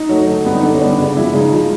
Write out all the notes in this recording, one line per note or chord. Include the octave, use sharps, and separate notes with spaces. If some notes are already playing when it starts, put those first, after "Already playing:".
Already playing: D#4
F#3 A3
D3
G3 B3
D#4
D3 D4
C#4
G3 B3 D4
C#3 D4
F3 G#3 E4
C#3 D#4
F3 G#3